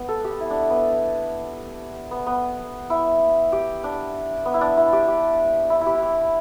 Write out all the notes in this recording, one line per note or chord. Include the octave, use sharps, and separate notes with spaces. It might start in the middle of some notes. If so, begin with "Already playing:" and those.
Already playing: B3
A4
G4
E4
D4
B3
B3
B3
E4
G4
D4
B3
E4
D4
E4
G4
G4
E4
E4 G4
E4
G4